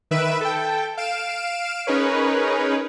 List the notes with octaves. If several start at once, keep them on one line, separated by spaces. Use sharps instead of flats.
D#3 B4 E5 D7 E7
A4 G5
F5 D7 E7
C#4 D#4 G#4 A#4 B4 C#5